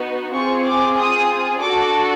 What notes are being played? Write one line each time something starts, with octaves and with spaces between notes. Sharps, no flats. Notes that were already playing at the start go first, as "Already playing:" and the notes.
Already playing: B3 D#4 F#4
C4 F4 G#4 C#6
D6
D#6
D4 F#4 A4 D6